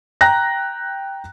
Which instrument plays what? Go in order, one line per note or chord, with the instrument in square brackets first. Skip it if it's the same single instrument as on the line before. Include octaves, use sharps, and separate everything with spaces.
[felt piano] G5 A#5 F#6 A#6